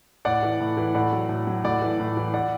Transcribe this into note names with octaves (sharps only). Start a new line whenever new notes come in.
A2 D5 F#5
E3
A2
E3
A2 D5 F#5
F#3
A2
F#3
A2 D5 F#5
E3
A2
E3
D5 F#5